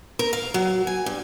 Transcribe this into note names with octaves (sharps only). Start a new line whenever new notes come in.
A#4
F5
F#3
G#5
G2